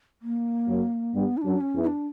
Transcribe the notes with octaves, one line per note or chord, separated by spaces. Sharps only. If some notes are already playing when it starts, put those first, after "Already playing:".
A#3
F#2 F#3
G2 G3 B3
E4
F#2 F#3 D4
C#4
E2 E3
E4
D4